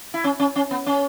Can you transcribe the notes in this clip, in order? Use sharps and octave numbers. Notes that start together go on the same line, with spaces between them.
E4
C#4
C#4
C#4
B3
C#4